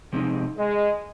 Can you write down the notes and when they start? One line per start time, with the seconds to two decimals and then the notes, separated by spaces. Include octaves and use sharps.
0.12 C3 F3 G#3 C4 D#4
0.57 G#3